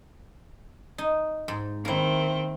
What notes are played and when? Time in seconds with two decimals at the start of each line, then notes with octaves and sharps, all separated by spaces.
0.98 D#4
1.48 G#2
1.85 D#3 A#3 C4 E4